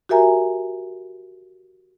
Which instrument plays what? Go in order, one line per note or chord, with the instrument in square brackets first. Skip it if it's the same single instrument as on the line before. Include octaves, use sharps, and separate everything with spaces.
[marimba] F#4 G4 A#4 E5 G#5 A#5